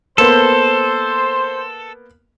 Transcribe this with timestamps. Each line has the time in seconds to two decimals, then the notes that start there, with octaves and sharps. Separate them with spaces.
0.18 A#3 B3 A4 C5